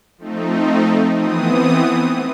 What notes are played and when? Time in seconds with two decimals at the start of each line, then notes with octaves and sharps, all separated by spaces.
0.18 F3 A3 C4 D#4
1.16 E3 B3 C4 D#6